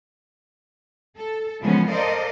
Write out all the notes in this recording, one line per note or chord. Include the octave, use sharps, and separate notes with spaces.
A4
C#3 E3 F3 G#3 B3 C#4
A4 A#4 C5 D5 D#5 F5